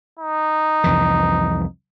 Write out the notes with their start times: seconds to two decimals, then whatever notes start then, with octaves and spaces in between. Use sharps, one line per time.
0.19 D#4
0.84 C2 F2 E3